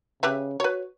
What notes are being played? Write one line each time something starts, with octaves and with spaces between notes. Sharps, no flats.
C#3 G4 B4 E5
F#4 B4 C#5